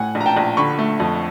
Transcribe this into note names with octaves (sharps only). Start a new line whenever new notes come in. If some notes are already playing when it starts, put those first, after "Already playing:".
Already playing: A2 F#5 G#5
A#1
A#5
G5 A5
A#1
D3 B5 C#6
A3
F2